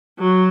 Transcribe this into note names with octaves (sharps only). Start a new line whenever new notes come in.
F#3